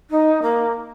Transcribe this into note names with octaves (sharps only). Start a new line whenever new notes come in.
D#4
A#3